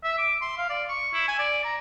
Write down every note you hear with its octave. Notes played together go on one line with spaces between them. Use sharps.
E5
D6
C6
F5
D5
C#6
E4
G#5
D5
A#5